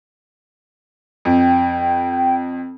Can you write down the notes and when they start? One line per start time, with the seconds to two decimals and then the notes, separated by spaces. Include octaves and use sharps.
1.25 F2 G5